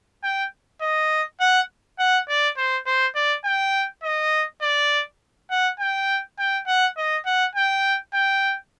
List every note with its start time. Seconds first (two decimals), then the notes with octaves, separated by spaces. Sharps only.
0.24 G5
0.81 D#5
1.40 F#5
1.99 F#5
2.29 D5
2.57 C5
2.86 C5
3.15 D5
3.45 G5
4.04 D#5
4.62 D5
5.50 F#5
5.79 G5
6.39 G5
6.67 F#5
6.97 D#5
7.26 F#5
7.55 G5
8.14 G5